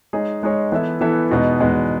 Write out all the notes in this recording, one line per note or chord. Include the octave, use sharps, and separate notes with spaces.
G#3 D#4 G#4 C#5
G#3 D#4 G#4 C#5
E3 B3 E4 A4 E5
E3 B3 E4 A4 E5
E2 B2 G#3 B3 D#4
E2 B2 G#3 B3 D#4